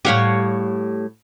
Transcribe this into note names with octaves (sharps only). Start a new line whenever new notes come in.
A2 G3 G4 C#5 F5 F#5